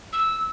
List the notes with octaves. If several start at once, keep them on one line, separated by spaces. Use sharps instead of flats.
E6